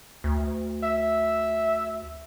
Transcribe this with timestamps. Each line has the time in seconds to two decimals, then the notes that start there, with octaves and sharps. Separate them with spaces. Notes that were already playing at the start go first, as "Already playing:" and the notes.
0.24 D2
0.83 E5